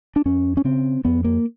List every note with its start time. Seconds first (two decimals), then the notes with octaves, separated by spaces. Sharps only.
0.16 D4
0.25 F2 C#4
0.57 C#4
0.65 C#3 C4
1.05 F2 B3
1.24 A#3